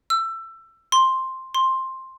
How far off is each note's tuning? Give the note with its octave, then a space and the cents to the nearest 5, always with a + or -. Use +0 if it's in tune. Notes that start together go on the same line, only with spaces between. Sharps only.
E6 +20
C6 +5
C6 +10